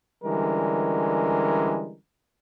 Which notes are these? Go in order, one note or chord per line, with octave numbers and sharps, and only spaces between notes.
D3 E3 G3 G#3 C#4 A#4